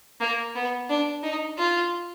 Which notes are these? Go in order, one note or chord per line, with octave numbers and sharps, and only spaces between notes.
A#3
B3
D4
D#4
F4